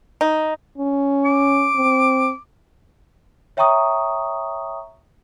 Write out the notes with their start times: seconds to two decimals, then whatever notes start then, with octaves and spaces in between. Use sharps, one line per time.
0.21 D#4
0.78 C#4
1.25 D6
1.76 C4
3.57 C#5 E5 G5 A#5 C#6 D#6